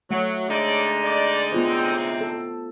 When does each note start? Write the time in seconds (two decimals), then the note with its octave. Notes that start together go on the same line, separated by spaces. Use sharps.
0.11 F#3 A3
0.49 D3 G#3 D#4 A4 C#5 D5
1.05 D5
1.52 A2 C3 B3 C4 F4 C5
2.21 A4